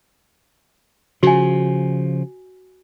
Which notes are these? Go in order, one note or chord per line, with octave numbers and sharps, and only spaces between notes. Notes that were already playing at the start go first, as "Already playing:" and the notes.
C#3 F3 F#4 G#5